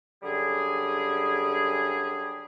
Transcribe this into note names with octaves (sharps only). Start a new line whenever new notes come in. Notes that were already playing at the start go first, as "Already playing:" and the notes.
F#2 D3 G3 G#4